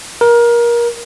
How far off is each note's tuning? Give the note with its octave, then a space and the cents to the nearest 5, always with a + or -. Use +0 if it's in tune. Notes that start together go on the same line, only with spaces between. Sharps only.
A#4 +25